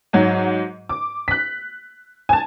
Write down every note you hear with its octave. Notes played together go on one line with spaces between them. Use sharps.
G#2 F#3
D6
F#6 B6
G#5 A5